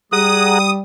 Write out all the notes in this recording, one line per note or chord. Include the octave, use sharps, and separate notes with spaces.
G3 G#4 F#5 A#5 D#6